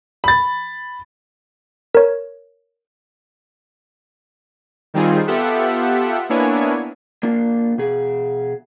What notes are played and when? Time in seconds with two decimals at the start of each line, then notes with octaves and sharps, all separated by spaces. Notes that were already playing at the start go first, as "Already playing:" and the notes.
0.24 B5 A6
1.95 A#4 C#5
4.94 D#3 G3 C4 D#4 F4 G#4
5.27 B3 F4 G4 A4 E5 F#5
6.29 A#3 B3 D4 E4 C#5 G#5
7.23 A#3 D4 F4
7.78 B2 G#4